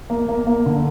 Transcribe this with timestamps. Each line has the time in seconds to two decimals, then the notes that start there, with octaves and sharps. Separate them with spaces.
0.10 A#3
0.29 A#3
0.47 A#3
0.66 D3